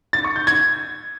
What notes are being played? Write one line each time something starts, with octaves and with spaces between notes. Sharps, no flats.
A6
C#6
G6
G#6